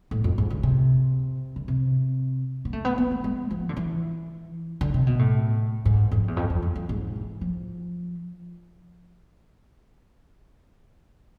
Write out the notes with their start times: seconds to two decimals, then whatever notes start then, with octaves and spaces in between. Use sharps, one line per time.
0.11 A2
0.24 F2
0.38 G#2
0.50 D3
0.63 C3
1.56 D3
1.68 C3
2.65 B3
2.73 A3
2.85 B3
2.98 B3
3.11 A3
3.24 G#3
3.51 F3
3.69 D3
3.77 E3
4.81 D3
4.94 C3
5.07 B2
5.19 A2
5.85 G#2
6.12 F2
6.28 E2
6.37 F2
6.50 F2
6.62 F2
6.76 F2
6.89 G#2
7.16 E3
7.41 F3